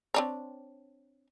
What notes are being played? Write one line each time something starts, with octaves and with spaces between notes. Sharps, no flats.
C4 D4 C#5